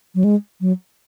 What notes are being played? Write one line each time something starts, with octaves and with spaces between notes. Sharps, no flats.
F#3
G#3
F#3